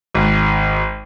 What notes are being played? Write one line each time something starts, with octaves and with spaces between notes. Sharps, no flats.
G#1